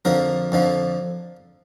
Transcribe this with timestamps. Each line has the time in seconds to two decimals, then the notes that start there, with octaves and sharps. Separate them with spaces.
0.05 F2 D3 F3 A#4
0.52 F2 D3 F3